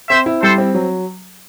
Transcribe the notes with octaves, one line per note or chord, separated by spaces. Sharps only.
C4 C5 E5
E4
G3 A4 C5
C4
F#3